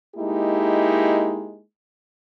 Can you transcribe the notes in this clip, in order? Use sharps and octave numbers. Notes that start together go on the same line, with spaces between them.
G#3 A#3 D#4 E4 G4